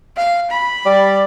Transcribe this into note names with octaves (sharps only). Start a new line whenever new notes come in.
F5
B5
G3 D5